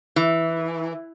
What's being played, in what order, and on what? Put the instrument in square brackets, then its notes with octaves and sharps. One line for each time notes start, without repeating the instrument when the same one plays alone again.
[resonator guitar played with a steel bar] E3